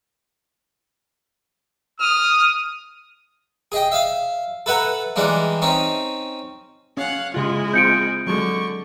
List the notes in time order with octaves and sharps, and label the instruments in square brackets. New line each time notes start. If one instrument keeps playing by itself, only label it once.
[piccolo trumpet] D#6 [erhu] F6
[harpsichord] G#4 D#5 G5
E5 F5
A4 B4 E5 F#5 A#5
E3 G3 G#3 D4 D#4
C4 C#4 D#4
[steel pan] C#4 [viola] F5 F#5
[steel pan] C#3 F4 [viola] G#3 E4
[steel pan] C4 F4 [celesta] G6 C#7 D7
[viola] D3 C#6 [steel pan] F#3 G#3